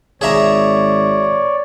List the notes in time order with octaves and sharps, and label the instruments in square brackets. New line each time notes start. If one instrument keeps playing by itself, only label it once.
[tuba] G#1 [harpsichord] G#4 E5 A#5 [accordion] C#5 D5